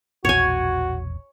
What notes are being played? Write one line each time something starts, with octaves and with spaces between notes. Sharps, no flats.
E1 A#1 E2 F#4 C#5 G#5